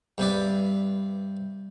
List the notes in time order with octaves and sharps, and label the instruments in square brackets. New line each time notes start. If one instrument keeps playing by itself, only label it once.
[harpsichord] G2 C3 B4 D5